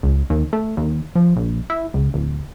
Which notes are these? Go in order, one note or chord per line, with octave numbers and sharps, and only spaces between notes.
C#2
D#2
A3
D#2
F3
A#1
E4
C#2
D1